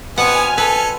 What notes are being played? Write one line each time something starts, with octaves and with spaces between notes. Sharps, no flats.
B2 B3 C4 F#5 G#5 F6
A4 B4